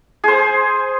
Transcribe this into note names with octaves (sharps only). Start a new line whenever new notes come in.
G#4 C5